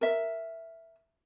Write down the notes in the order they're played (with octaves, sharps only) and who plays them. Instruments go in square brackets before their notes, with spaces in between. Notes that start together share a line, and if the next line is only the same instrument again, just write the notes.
[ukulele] A#4 E5